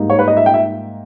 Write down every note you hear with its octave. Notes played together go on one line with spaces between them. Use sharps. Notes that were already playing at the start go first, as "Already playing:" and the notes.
Already playing: G#2 G3 A#3 D#4
C#5
B4
D#5
E5
G5
E5